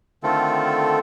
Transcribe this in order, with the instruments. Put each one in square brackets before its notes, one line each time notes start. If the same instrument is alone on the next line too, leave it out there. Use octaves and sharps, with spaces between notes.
[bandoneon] D3 D#3 A3 C4 F4 A4